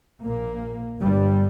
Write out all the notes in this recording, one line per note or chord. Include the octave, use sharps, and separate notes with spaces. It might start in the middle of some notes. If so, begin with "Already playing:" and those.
A#1 A#2 A#3
G1 G2 G3